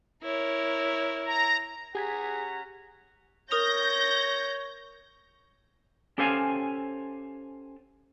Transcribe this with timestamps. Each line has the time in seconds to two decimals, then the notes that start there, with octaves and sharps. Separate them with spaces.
0.24 E4 A#4 C#5
1.26 A#5
1.95 C#4 G4 G#4 F#5 A#5 G#6 B6
3.51 A#4 C#5 D#6 G6 A#6 F7
6.18 C#4 G4 A4 C5 F5 G#5